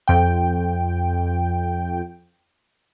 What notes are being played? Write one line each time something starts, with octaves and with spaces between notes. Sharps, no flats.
F2 G5